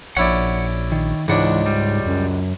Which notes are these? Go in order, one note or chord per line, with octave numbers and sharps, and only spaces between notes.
A#1 C#4 E4 D5 F#5
D#3
C#2 G#2 E3 D4 F#5
G3
F#2